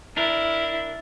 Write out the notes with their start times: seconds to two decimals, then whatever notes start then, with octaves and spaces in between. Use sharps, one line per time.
0.17 D4 E4 A#4